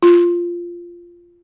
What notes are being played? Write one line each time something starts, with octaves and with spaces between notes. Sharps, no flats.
F4